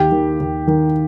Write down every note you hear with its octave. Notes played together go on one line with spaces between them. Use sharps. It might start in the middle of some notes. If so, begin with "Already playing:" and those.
Already playing: D#2 G4
D#3
D#2
D#3